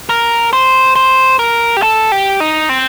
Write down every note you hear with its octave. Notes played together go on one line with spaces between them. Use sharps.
A#4
C5
C5
A#4
G4
A4
G4
D#4
C4